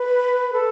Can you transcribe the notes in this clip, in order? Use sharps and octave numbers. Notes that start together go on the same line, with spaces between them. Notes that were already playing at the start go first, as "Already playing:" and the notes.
Already playing: B4
A4